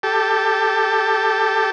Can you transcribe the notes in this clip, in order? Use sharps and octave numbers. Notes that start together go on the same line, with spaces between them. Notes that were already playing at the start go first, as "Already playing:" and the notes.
G4 A4